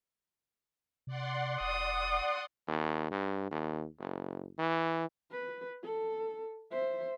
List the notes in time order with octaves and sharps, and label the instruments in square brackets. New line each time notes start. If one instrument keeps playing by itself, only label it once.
[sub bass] C3 [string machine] D5 F#5 C6
[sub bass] F1 [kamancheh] D#6
[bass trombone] D#2
G2
D#2
F#1
E3
[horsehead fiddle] B4
A4
C5 E5